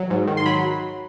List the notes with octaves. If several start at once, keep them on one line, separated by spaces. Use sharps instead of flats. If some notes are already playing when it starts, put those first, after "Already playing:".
Already playing: F#3
G#2
D#3
C6
F#3 B5